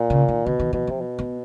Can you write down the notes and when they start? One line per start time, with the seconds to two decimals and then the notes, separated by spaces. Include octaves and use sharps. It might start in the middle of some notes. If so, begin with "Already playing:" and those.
Already playing: A#2
0.10 C#3
0.28 D#3
0.46 B2 D3
0.59 D#3
0.73 B2 E3
0.87 C3 F3
1.01 B2
1.19 B3